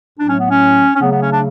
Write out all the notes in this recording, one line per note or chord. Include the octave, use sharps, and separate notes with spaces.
A2 F#3 A3 D4
C#4
B3
C#4
C#4
C#3 F#3 A3 B3
B3
C#4
D4